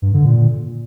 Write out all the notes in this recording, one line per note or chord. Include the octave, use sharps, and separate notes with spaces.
G2
D3
A#2